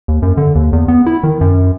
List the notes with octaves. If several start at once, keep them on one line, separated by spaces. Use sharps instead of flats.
D#2
F#2
D3
D#2
E2
B3
E4
D#3
F#2